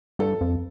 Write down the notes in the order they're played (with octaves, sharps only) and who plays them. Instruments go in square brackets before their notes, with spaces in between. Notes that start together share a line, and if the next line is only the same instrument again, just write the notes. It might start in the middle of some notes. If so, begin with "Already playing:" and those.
[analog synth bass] G2 [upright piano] A4
[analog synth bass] F2